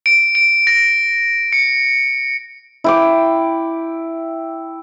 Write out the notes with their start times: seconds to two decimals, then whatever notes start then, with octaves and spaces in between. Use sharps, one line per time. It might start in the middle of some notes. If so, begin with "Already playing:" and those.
0.06 D7
0.35 D7
0.67 A#6
1.53 C#7
2.84 E4 G5 D6